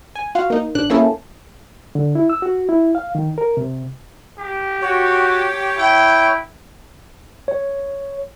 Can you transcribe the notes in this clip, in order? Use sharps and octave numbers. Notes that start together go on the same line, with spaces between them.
G#5
F4 F#4 F5
A#3 D#4
A1 D4 F#6
A3 A#3 C#4 E4 G#4 A4
D3
E4
E6
F#4
E4
F5
D#3
A#4
C3
G4
F#4 C#5
E4 G5
C#5